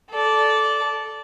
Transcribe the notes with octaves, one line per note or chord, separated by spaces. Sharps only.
A4 D5